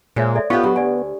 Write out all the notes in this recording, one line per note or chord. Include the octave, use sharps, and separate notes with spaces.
A#2 G#3 C5 C#5 E5
A4 D5 E5
B3 F4 G4 C#6
F#3 D4 G4 D#6
D2 D5 G#5